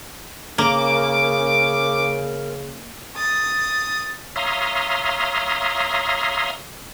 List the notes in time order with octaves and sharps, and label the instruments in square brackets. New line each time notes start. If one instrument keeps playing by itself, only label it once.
[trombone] C#3 [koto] A#3 [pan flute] A#4 [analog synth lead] D6
[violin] D#6 A6
[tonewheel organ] C#5 E5 F5 A#5 C6 D#6